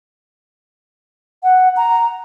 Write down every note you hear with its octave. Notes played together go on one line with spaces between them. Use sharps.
F#5
A#5